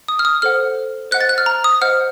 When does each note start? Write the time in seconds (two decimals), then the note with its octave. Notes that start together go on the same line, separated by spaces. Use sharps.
0.08 D#6
0.19 F6
0.25 D#6
0.42 A4 C5 F#5 F6
1.11 C5 D#5 F#5 F#6
1.21 A6
1.29 F#6
1.38 F6
1.46 A#5
1.64 D#6
1.81 C5 D#5 F#5 F6